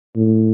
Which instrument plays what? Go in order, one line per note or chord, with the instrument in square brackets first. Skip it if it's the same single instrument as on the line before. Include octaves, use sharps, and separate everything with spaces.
[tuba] A2